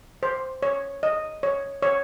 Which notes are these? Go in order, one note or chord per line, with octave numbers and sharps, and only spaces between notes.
C5
C#5
D#5
C#5
C#5